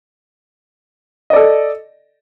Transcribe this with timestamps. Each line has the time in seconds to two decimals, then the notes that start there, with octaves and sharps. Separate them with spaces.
1.30 D#5
1.33 D5
1.36 A4